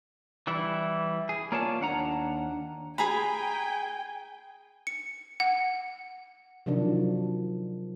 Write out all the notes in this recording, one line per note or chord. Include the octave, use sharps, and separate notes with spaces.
E3 G3 E4
G#4
A#3 F4 C#5 D5 A5
D#2 D4 F#5 A#5
G#4 G5 G#5 A#5 B5
C#7
F#5
C3 D#3 F3 F#3 D4